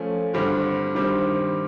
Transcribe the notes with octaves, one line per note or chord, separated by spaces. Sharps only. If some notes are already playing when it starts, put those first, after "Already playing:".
Already playing: F3 A3 C#4
G2 D3 G3 C4
G2 D#3 G3 C4